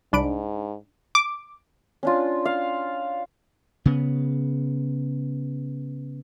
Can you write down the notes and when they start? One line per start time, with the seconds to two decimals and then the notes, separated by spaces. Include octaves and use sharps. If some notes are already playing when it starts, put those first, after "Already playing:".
0.13 C2 G#2 D4 B5 D7
1.15 D6
2.03 C#4 D4 F4
2.45 F5
3.86 C#3 B3